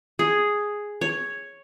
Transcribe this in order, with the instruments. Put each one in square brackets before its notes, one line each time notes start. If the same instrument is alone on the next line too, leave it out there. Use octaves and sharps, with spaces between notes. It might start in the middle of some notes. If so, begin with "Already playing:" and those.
[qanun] G#4
C#5